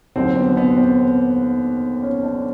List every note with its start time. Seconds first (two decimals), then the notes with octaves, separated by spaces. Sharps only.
0.16 D#2 D3 F#3 C4
0.36 B3
0.57 B3
0.78 C4
2.02 C#4
2.23 D4